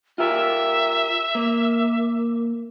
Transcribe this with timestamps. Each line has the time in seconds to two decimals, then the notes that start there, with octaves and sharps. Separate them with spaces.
0.18 F4 G4 A#4 E5
1.35 A#3